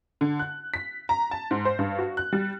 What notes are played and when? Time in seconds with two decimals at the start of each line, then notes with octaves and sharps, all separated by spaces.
0.21 D3
0.39 F#6
0.74 B6
1.09 A#5
1.31 A5
1.51 G#2
1.65 C5
1.79 G2
1.99 F#4
2.17 F#6
2.33 G3